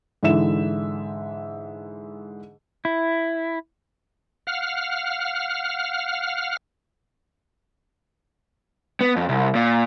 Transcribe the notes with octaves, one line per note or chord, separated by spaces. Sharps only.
G#2 D3 E3 E5 E7
E4
F5 F#5 F6
B3
F2
C2
A#2